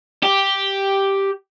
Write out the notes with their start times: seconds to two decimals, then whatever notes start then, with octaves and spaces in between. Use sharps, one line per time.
0.23 G4